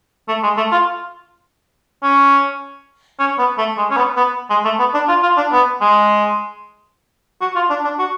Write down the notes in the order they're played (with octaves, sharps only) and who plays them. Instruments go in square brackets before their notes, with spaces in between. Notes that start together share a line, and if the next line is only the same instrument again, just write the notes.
[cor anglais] A3
G#3
A3
F4
C#4
C#4
B3
A3
G#3
C#4
B3
B3
G#3
A3
B3
D4
F4
F4
D4
B3
G#3
F#4
F4
D4
D4
F#4